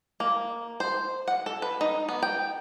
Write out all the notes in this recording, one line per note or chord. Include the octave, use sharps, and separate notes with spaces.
A#3
C5
F#5
A4
B4
D#4
B3
G5